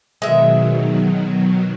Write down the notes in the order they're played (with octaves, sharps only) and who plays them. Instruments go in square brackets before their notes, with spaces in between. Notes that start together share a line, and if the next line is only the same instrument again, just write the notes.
[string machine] B2 D#3 F#3 [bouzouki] G#3 E5